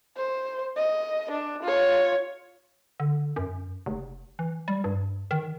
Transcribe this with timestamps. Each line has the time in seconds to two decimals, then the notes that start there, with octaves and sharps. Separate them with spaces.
0.16 C5
0.77 D#5
1.31 D4
1.63 F4 C#5
3.00 D3
3.36 F#2
3.86 F1
4.39 E3
4.68 G3
4.84 G2
5.31 D#3